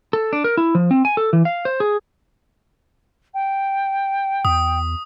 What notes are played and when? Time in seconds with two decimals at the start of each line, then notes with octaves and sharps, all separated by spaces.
0.13 A4
0.33 D4
0.44 A#4
0.57 E4
0.75 F3
0.91 C4
1.05 G#5
1.17 A4
1.33 E3
1.45 F5
1.65 C5
1.80 G#4
3.34 G5
4.45 E2 D#6